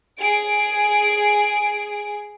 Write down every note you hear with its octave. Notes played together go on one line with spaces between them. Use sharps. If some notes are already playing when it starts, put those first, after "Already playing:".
G#4 D7